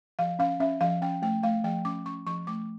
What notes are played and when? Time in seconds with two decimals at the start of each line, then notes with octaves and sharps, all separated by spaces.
0.19 F3 F5
0.39 C#4 F5
0.60 C#4 E5
0.81 F3 F5
1.02 C#4 G5
1.22 A3 G5
1.43 A3 F5
1.64 F3 G5
1.85 C#4 D6
2.05 C#4 C#6
2.27 F3 C#6
2.47 A3 D6